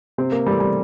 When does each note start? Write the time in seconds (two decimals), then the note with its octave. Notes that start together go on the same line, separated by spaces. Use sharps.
0.18 C3 C4
0.32 A#3
0.46 E3 G3 A3 C4
0.60 G3